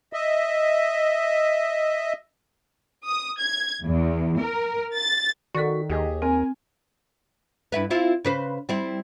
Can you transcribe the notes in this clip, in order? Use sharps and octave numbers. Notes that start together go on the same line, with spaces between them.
D#5 E5
D#6
G#6
E2
A#4
A6
D#3 F#4 A4 D5 C#6 B6
D#2 G4 G#4 D#5
C4 A#4 G#5
G2 E4 B4
C4 E4 F4
C#3 B4 C5
G3 C4 E4